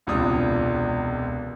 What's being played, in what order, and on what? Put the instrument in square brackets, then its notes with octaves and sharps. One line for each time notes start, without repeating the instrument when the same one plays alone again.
[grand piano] E1 C#2 C3 D4 D#6